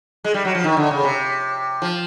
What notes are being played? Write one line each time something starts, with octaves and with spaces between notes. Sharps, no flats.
G#3
G3
F#3
F3
D#3
D3
C#3
C3
F3